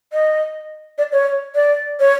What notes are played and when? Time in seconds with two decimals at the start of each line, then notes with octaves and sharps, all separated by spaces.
0.13 D#5
0.98 D5
1.12 C#5
1.55 D5
2.00 C#5